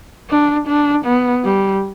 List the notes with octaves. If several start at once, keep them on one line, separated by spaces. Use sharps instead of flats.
D4
D4
B3
G3